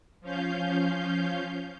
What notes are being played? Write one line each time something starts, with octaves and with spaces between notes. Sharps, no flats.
F3 C#4 F5 G6